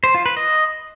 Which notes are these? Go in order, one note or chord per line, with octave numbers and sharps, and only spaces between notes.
C5
F4
B4
D#5